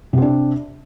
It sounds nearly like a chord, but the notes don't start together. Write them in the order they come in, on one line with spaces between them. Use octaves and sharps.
C3 C4 D4